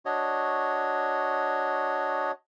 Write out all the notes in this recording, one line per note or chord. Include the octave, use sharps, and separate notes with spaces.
D4 F#4 C#5 D#5